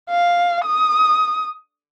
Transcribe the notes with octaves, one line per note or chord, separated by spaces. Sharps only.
F5
D#6